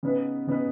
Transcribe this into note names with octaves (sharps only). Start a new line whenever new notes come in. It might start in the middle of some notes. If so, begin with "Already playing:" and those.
C#3 B3 D#4 B4
C#3 B3 D#4 B4